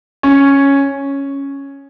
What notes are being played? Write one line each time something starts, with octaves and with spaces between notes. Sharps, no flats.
C#4